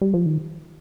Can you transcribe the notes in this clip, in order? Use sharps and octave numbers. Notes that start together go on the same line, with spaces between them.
G3
F3
D#3